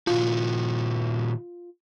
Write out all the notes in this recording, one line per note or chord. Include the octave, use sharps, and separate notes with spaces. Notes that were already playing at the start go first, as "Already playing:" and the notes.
A#2 D#3 F4 F#4